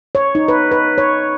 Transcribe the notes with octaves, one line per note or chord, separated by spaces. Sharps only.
C#5
D#4
B4
B4
C#5